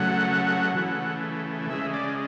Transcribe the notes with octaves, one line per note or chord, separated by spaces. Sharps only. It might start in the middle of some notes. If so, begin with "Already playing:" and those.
Already playing: C#3 F#3 A3 F#5
C#3 E3 A3
C#3 G#3 E5
D5